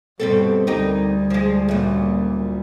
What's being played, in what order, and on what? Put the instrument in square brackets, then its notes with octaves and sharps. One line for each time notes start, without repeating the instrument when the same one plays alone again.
[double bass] G2 B2 [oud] G3 C4 A4
[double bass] D2 G3 [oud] D#4 G4 A#4
[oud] F3 G#3
F#2 A#2